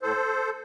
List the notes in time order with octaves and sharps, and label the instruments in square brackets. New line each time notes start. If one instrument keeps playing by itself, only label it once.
[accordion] A2 A4 C5